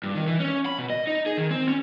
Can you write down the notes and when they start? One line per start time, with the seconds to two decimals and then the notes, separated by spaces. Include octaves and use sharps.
0.04 G2
0.15 D#3
0.27 E3
0.40 C#4
0.66 B5
0.79 B2
0.90 D#5
1.07 D#4
1.26 G#4
1.38 D#3
1.50 C4
1.68 C#4